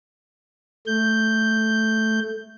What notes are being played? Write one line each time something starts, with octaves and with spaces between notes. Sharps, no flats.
A3 G6